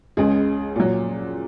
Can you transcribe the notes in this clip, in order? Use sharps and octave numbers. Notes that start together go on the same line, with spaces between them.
C#2 C#3 G#3 G#4
A#2 F#3